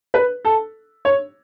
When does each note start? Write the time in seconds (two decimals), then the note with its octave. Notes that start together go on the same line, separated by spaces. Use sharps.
0.14 B4
0.45 A4
1.05 C#5